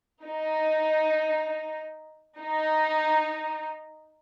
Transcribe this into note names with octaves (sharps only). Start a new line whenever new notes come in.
D#4
D#4